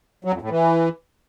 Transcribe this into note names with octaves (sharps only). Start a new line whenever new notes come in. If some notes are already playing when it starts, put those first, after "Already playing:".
F#3
F2
A2
E3